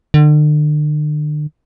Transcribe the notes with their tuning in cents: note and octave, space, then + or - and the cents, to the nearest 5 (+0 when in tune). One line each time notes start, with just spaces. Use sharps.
D3 +40